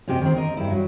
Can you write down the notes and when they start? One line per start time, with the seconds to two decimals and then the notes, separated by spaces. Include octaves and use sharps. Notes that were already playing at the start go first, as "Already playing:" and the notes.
0.08 F#2 C3 G4 G#4 D#5
0.21 D#3 C4
0.37 A#4 D#5
0.57 G2 E4
0.71 F#3